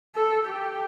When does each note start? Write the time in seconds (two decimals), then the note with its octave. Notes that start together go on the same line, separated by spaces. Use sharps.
0.15 A4
0.47 G4